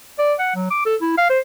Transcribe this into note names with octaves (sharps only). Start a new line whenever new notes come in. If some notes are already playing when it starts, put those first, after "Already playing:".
D5
F#5
F#3
D6
A4
E4
F5
C5